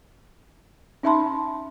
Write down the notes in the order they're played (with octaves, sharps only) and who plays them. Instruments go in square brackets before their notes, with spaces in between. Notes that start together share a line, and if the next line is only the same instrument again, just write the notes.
[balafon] C#4 D#4 E5 A5 B5 C6